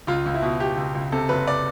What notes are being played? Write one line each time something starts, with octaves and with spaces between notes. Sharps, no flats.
C#2 F4
C#2
E4
B2
B2 G4
C#2
C#2
C3 A4
F#1 B4
D5